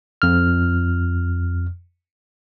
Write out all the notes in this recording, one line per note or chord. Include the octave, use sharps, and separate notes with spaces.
F2 F6